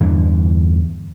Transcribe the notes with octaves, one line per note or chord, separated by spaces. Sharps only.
E2 G2 D3 E3